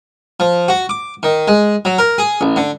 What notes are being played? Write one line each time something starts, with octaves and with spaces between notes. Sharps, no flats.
F3
F#4
D6
D#3
G#3
F#3
A#4
G#4
A1
D3